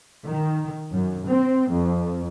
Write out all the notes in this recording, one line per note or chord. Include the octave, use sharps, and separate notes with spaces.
D#3
F#2
C4
F2